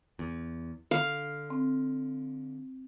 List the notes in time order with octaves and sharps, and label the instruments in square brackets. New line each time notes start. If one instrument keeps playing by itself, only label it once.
[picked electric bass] E2
[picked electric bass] D3 [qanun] F5
[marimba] C4